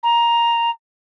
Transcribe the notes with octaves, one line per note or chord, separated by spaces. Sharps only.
A#5